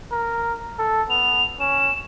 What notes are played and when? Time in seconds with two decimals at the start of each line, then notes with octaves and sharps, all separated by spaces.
0.12 A#4
0.79 A4
1.10 B3 F7
1.60 C#4 E7